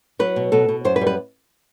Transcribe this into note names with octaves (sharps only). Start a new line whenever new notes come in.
F#3 B4
B2
B2 A4
B2
F#2 C5
B4
G3
B4